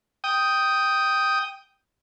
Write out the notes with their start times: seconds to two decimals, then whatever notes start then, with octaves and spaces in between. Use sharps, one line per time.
0.24 G5 D#6